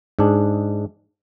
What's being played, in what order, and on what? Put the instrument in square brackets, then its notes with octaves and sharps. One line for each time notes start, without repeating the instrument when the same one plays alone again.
[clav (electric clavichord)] G#2 D4 G#4